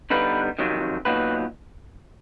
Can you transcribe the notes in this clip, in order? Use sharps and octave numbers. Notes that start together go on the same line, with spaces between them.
D3 G3 B3 D#4 B4
F2 C3 D#3 F#3
A#2 F#3 B3 D#4 B4